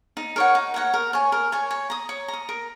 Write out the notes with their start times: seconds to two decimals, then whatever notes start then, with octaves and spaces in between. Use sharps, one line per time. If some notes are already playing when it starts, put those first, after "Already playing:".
0.17 D#4
0.36 A#4 C#5 F#5
0.55 D#4
0.74 A#4 C#5 F#5
0.94 A#4
1.13 C#5 G#5
1.32 A#4
1.52 C#5 G#5
1.71 C#5
1.90 A#5 D#6
2.09 C#5
2.28 A#5
2.33 D#6
2.49 A#4